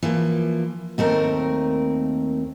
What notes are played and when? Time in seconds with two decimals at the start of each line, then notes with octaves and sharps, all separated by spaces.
0.03 E3 F3 A#3
0.98 D#2 A3 C4 A#4